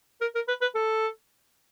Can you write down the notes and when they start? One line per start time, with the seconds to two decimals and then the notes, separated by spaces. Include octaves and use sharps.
0.21 A#4
0.35 A#4
0.48 B4
0.61 B4
0.75 A4